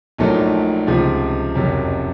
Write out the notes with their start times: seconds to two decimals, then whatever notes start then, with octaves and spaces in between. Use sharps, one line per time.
0.18 A#1 A#2 F#3 A3 D#4
0.87 C#2 C3 F3
1.55 F#1 F2 C3 F#3